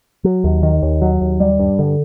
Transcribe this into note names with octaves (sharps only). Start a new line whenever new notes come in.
F#3
D#2
D#3
D#2
F#3
D#2
G3
G2
D3